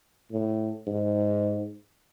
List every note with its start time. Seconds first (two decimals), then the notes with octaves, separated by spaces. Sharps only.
0.31 A2
0.87 G#2